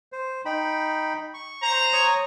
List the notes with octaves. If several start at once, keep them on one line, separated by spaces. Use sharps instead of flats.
C5
D#4 G5 B5
C#6
C5 A#5
C#5 C#6 D#6